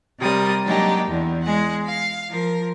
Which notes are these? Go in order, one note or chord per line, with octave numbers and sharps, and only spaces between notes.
C3 G3 A#4 D#6
F#3 G#3 A#3 D4 D#4 G4
E2
G#3 G#4 F#5
F5
F3 A#4